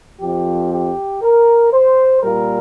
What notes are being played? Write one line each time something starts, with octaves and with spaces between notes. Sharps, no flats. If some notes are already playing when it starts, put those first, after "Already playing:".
F2 F3 C4 G4
G4
A#4
C5
A#2 G3 A#3 A#4